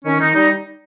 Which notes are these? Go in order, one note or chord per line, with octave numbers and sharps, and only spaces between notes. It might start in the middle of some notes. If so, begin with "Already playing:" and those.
D#3 C#4
D#3 D#4
G3 D#4